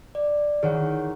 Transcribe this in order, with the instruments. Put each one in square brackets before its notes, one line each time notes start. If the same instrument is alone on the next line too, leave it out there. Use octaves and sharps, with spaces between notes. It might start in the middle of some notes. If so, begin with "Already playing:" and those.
[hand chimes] D5
[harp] D#3 E3 [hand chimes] G#4 C#5 F#5